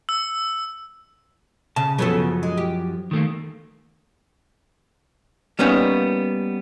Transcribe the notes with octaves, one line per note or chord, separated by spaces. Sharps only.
E6
C#3 A5
F#2 C#3 F3 F#3 B3 A4
G#3
G4
D#3 A3 A#3
G3 A#3 B3 C#4 D#4